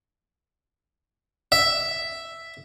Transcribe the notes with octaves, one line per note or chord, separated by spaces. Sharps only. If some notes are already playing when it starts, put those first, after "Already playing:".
E5